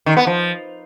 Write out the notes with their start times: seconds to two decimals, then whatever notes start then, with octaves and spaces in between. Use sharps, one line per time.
0.06 D#3
0.17 B3
0.27 F3